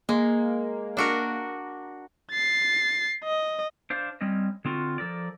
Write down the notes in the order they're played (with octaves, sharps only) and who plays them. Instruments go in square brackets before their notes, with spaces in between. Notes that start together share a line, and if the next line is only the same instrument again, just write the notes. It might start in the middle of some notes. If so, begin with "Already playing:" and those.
[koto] G#3 [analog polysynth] A#3
[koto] D4 F#4 A#4
[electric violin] A6 C7
D#5
[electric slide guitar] D4 C5 F5
G3 C4 C#4 D#5
D3 C4 F4 F#4
F3 A4 A#4 D5